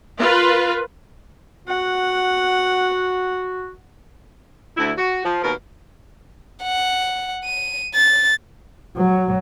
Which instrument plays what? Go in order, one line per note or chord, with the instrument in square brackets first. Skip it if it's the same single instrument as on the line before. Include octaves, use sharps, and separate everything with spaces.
[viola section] F4 A#4 B4
[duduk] F#4 [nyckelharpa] F#5
[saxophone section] D2 E4
F#4
F3
D#2 B2 A#4
[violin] F#5
D#7
A6
[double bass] F#3